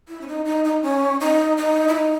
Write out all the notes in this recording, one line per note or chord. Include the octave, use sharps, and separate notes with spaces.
E4
C#4
D#4
D#4
D#4
C#4
D#4
D#4
E4
D#4